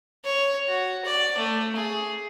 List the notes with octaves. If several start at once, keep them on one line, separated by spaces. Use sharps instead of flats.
C#5
F#4
D5
A3
G#4